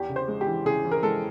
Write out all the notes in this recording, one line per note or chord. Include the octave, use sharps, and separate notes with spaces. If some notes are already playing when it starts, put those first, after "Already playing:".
Already playing: E2 G4
C#3
C5
G#3
G4
E3
C#3 G#4
E3
A#4
G#3 A4